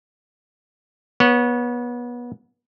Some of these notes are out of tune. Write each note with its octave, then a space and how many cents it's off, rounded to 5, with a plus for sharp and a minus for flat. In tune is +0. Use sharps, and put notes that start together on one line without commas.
B3 -25 C#5 +0